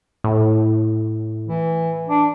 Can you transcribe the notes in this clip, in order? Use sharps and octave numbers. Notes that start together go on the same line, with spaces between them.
A2
E3
D4